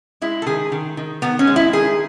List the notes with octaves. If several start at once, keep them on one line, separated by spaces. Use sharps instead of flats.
G#3 E4
A4
D#3 G#4
D#3
D#3
D#3 B3
C#4
G#3
E4
D#3 G#4